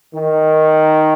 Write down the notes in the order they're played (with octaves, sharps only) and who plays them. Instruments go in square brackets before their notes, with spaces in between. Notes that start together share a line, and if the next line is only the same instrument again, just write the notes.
[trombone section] D#3